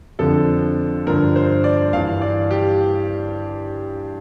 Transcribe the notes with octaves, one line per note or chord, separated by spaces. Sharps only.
F2 D3 F3 A4
G2 D3 F3 A#4
C5
D5
G2 E3 F5
D5
G4